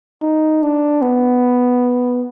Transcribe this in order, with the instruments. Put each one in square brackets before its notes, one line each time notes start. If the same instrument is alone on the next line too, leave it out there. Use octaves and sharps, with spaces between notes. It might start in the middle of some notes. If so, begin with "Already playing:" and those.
[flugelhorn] D#4
D4
B3